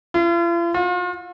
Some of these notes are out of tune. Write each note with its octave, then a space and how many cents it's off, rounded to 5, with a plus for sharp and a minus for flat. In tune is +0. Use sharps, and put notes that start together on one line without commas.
F4 -45
F4 +40